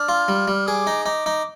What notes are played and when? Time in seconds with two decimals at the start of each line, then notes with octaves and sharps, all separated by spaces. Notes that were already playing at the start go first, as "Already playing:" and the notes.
Already playing: D4 F6
0.09 F4
0.28 G3
0.48 G3
0.67 G#4 D6
0.87 D#4
1.06 D#4 D6
1.26 D#4